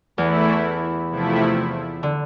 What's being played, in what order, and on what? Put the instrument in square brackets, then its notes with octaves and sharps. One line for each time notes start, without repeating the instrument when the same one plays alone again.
[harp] E2 [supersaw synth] E3 A3 E4
[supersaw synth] C3 F3 A3 E4
[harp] D3